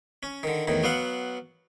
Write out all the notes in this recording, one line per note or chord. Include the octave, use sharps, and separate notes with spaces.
C#4
D3 D#3
E2 A2 D#3
F#3 B3 F5 F#5